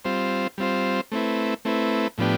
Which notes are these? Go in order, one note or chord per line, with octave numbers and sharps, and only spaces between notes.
G3 C4 F4 C5
G3 C4 F4 C5
A3 C4 E4 B4
A3 C4 E4 B4
A2 F3 B3 D4 G4